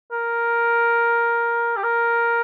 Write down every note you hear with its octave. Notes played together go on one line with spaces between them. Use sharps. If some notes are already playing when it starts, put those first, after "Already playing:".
A#4
G4
A#4